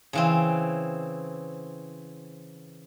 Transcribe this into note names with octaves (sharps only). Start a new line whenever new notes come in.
C#3 E3 C4